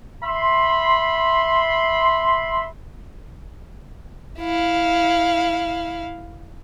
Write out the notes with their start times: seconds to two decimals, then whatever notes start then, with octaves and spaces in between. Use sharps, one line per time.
0.24 E5 B5 C6
4.40 E4 F5